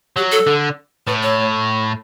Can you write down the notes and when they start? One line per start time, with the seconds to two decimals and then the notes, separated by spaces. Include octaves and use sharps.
0.17 F#3 G4
0.32 A4
0.47 D3
1.07 A2 B4
1.22 C#5